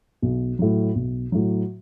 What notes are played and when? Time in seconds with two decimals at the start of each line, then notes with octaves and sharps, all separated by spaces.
0.22 B1
0.59 A2 F#3
0.95 B1
1.32 A2 F#3